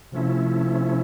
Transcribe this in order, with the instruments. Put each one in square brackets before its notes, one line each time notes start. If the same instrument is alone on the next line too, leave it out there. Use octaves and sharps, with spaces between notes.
[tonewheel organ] C3 F3 A3 C#4 E4